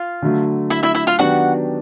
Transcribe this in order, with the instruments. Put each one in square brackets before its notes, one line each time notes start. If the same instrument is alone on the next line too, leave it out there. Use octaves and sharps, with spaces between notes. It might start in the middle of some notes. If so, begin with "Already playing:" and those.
Already playing: [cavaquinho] F4 F5
[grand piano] D3 F#3 A3
[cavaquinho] E4 E5
E4 E5
E4 E5
F4 F5
[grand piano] D#3 F#3 B3 D4 G4 [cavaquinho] F#4 F#5